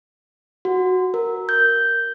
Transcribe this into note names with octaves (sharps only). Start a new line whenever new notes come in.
F#4
A#4
G6